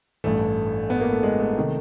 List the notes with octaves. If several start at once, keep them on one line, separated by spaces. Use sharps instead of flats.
A1 G2 E3 A3
B3
A#3
A3
G#3
A3
C3 D#3